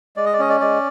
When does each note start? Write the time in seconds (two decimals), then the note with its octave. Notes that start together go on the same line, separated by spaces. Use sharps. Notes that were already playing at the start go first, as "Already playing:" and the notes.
0.17 G#3 D5
0.26 D#5
0.33 D5
0.39 C#4 D#5
0.49 D5
0.60 G#3 D5